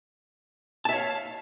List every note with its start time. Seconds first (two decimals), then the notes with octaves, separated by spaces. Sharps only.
0.85 A5
0.89 E5
0.92 C#5
0.96 F5